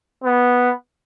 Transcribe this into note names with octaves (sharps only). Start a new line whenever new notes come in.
B3